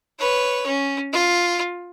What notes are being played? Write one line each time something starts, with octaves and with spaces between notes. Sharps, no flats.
B4 C#5
C#4
F4